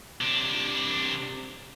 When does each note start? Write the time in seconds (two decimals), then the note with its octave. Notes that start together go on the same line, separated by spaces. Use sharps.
0.21 C3 D4